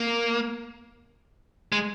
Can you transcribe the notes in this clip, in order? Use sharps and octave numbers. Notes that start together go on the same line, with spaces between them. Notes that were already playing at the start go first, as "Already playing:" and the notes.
Already playing: A#3
G#3